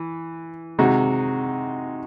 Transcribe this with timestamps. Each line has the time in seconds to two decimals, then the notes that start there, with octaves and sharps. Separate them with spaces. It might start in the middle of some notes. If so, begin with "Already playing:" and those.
Already playing: E3
0.78 C3 D#3 G#3 D#4 F#4